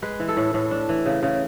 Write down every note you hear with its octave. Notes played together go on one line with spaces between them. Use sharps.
G#3 B4
E3
A4
A2
A2
D4
E3
C#3
C#3